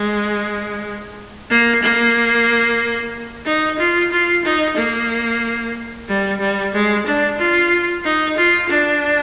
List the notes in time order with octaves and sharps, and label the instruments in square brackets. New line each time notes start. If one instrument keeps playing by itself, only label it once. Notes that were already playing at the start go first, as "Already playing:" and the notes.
Already playing: [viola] G#3
A#3
A#3
D#4
F4
F4
D#4
A#3
G3
G3
G#3
D4
F4
D#4
F4
D4